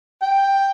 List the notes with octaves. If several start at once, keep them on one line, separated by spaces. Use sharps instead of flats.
G5